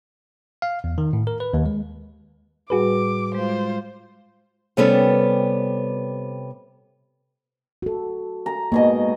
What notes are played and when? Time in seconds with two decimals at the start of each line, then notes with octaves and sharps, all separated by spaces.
0.62 F5
0.84 E2
0.98 D#3
1.13 A2
1.27 A#4
1.40 B4
1.54 D#2
1.66 G#3
2.70 A2 G3 F#4 G#4 B4 D6
3.35 G#3 F4 C5
4.77 C3 G3 B3 C#4 A4 B4
7.82 F#4 A4
8.46 A#5
8.72 G#2 B2 A#3 D#5